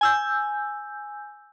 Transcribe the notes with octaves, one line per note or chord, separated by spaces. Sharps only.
G#5 E6 G6